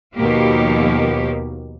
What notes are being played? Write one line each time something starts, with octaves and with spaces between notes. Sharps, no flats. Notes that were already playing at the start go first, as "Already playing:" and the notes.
D#2 B2 F3 A#3 G4